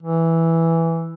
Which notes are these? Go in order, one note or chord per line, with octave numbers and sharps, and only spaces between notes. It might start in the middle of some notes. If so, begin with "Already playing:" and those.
E3